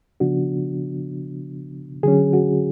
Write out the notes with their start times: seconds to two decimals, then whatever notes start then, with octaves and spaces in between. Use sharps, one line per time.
0.20 C#3 F3 B3 D4 F#4
2.03 D3 F#3 C#4 G#4
2.33 F#4